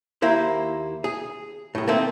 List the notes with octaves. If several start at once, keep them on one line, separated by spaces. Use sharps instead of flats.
D#2 A#3 E4 C5
G#4
C2 A2
D#3 A3 A#3 C4